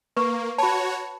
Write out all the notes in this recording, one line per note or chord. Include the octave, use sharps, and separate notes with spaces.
A#3 B4 C#6
F#4 C#5 A5 B5